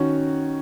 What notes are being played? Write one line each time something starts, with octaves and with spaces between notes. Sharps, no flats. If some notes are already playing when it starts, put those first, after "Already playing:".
Already playing: D#3 C#4 F#4